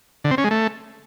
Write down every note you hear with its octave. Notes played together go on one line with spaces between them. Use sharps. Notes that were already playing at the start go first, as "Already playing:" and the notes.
D3
C4
C#4
G#3
A3